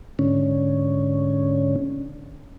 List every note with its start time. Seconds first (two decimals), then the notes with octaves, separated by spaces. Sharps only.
0.19 G#2 D3 C#4